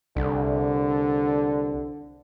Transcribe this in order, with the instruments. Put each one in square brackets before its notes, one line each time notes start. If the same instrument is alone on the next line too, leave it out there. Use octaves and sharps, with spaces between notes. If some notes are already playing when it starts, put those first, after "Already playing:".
[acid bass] C2 [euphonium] D3